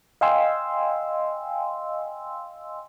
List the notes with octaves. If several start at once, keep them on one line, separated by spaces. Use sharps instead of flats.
D#5 F5 G5 G#5 C6 E6